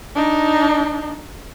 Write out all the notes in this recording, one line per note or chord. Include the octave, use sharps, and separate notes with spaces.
D4 D#4